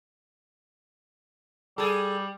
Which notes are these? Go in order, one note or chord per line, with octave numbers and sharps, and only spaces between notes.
G3 G#4 A4